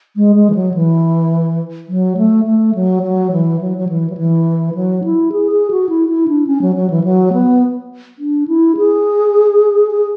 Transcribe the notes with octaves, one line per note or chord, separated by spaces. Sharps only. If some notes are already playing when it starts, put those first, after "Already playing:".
G#3
G#3
E3
F#3
E3
F#3
A3
A3
F#3
F#3
E3
F#3
F#3
E3
F#3
E3
F#3
E4
G#4
G#4
F#4
E4
E4
D4
C#4
F#3
F#3
E3
F#3
B3
D4
E4
G#4
G#4